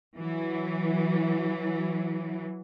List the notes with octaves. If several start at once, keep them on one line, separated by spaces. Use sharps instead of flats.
E3 F#3